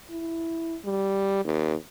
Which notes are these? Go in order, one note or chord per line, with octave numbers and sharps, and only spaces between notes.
E4
G3
D#2